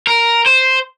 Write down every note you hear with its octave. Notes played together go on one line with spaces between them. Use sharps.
A#4
C5